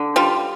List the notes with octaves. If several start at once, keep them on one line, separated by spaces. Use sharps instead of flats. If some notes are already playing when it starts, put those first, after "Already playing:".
Already playing: D3
G3 F4